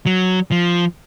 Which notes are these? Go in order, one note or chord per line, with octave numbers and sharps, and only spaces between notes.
F#3
F3